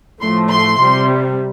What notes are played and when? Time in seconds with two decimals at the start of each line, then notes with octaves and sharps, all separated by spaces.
0.21 A2 F3 A3 C6
0.50 C6
0.78 C3 G3